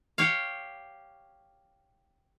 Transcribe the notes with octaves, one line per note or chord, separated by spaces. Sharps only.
G4 C#5 F5